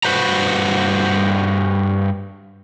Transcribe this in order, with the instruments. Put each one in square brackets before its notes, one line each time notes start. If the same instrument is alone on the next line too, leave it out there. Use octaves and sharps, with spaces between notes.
[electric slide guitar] G2 F#4 B4 C5 A#5